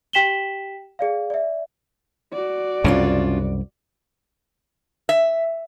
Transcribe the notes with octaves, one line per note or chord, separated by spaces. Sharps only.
G4 G5 B6 E7 F#7 G7
G#4 D5 F5
D5 E5
F#4 D5
C2 F#2 C#3 C#4 D4 F4
E5